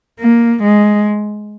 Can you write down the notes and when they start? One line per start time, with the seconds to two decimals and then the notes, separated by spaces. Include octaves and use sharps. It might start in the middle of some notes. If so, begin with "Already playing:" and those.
0.20 A#3
0.63 G#3